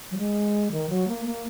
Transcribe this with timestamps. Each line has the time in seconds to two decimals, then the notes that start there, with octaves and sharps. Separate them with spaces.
0.11 F#3
0.18 G#3
0.72 D#3
0.89 F#3
1.08 A#3
1.25 A#3